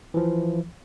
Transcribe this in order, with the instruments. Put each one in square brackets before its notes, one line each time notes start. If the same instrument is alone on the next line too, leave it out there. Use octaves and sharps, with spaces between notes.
[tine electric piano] E3 F3